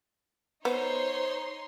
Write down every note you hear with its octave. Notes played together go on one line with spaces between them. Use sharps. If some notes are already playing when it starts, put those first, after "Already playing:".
B3 D#4 C5 C#5 C6